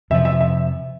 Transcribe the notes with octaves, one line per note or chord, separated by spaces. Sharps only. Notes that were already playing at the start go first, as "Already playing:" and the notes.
F2 C3 F3 E5
E5
E5